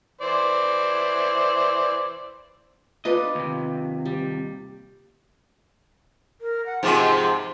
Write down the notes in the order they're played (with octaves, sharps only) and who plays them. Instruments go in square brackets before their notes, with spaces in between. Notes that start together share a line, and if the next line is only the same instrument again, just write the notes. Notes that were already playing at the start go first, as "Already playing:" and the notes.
[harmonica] E3 C5 D5
[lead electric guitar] D4 D#5 [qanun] F4 B4 D5
[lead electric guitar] D#2 C3
[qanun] G3
[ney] A#4
F#5
[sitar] G#2 C3 F3 [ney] C6